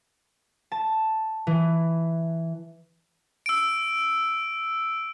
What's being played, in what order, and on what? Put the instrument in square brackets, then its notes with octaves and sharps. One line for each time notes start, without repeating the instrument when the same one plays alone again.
[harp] A5
E3
[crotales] E6 D7